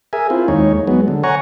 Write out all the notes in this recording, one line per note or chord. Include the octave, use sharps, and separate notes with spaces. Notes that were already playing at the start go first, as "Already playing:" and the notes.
G#4 A#4 E5 G#5
C4 E4 F4
D#2 G#3 D#4 C#5
F#3 G#3 B3
D3
C#5 F#5 G#5 A#5 C#6